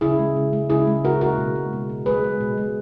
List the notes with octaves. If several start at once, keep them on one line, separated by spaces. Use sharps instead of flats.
C#3 E4 G#4
G#3
C#3
G#3
C#3 E4 G#4
G#3
C#3 F#4 A#4
G#3 F#4 A#4
B2
G#3
B2
B2
G#3 G#4 B4
G#3
B2
G#3